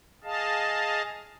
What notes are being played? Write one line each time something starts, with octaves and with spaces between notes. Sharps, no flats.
G#4 D#5 F5 A5